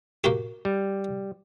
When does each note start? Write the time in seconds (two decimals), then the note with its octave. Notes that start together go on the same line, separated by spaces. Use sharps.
0.24 A#3 F#4 G4
0.65 G3